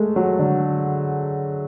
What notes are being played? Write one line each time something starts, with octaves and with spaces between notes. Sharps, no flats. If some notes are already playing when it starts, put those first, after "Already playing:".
Already playing: G#3 A3
F#3
D3